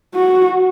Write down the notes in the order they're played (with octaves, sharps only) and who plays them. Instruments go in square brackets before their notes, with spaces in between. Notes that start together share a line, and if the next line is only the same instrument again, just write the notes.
[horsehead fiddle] F#4